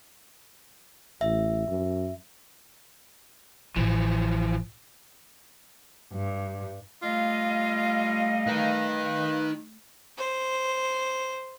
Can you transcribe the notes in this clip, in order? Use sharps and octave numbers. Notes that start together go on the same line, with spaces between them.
A1 E5
F#2
A1 E3 F3
G2
G3 A3 F4 D#5 F5
D#4 A#4 B4
C5